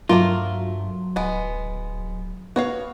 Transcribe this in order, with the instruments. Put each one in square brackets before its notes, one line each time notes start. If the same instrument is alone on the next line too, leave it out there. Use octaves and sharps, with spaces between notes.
[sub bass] G2 [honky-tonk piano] F#3 [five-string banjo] A3 A#3 A#4 [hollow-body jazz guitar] F4
[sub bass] D1 [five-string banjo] G#3 B3
[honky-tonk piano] B3 [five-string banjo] F#4 C#5 F5